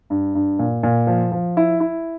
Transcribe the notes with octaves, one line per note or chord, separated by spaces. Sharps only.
G2
G2
A#2
A#2
F3
F3
E4
E4